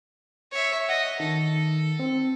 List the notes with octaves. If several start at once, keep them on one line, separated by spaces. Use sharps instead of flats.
C#5 E5
D#5 F#5
D#3 A4
C4